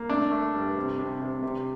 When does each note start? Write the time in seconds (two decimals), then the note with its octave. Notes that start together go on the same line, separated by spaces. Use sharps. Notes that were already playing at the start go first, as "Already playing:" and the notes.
Already playing: A#3
0.09 A3 D4
0.31 A3
0.55 G2
0.77 C3
0.99 C3
1.21 C3
1.43 C3